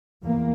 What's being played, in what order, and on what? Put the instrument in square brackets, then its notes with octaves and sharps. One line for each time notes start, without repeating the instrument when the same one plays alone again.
[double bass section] E2 A#3